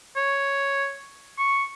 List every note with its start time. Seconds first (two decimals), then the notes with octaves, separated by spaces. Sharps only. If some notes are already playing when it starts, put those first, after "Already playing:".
0.16 C#5
1.38 C#6